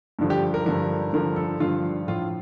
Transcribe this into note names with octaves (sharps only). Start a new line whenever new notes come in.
G2 D3 F3
G4
A#4
G2 D3 F3 A#4
G2 D3 F3 A#4
A4
G2 D3 F3 F4
A2 F3 F4